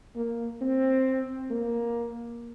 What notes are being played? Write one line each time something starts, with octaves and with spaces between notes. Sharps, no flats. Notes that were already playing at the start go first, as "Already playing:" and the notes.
A#3
C4
A#3